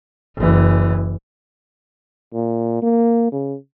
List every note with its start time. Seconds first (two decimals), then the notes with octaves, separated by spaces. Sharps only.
0.37 F#1 E3
2.34 A#2
2.82 A#3
3.32 C#3